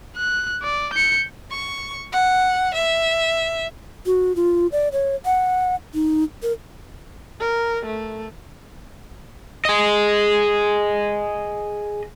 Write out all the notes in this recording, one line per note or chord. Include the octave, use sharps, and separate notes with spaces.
F#6
D5
G6 C#7
C#6
F#5
E5
F#4
F4
D5
C#5
F#5
D#4
A#4
A#4
A3
G#4 D#5